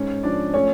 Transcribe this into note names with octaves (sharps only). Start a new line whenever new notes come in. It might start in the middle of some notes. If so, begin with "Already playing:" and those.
Already playing: G#2 C#4
F3 D4 D5
A3 C#4 C#5